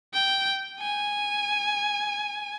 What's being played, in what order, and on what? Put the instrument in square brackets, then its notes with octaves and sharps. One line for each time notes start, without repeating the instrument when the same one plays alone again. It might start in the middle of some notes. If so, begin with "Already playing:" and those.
[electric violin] G5
G#5